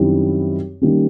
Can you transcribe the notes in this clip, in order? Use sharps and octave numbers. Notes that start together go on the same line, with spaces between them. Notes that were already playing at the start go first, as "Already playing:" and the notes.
Already playing: F#2 D#3 G3 C4 E4
D#3 G3 A#3 C#4